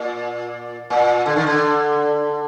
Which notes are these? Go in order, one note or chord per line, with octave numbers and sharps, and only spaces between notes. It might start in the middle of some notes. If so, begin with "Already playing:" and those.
Already playing: A#2
A#2
D3
D#3
D3